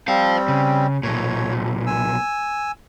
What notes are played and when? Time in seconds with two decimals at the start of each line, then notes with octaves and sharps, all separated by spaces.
0.08 G3 C4 C5 F5
0.48 C#3
1.03 B1 A#2 C#5
1.87 G#5 E6